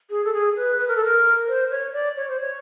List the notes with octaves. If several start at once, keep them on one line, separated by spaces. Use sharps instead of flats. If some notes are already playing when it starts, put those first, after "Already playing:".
G#4
A4
G#4
B4
B4
A#4
A4
A#4
C5
C#5
D5
C#5
C5
C#5